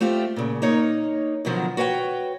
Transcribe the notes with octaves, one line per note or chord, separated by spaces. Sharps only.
A3 C4 F4 G4
A#2 C#3
A#3 D#4 C#5
B2 D3 D#3 F3 F#3
F#4 B4 C#5 F#5 G5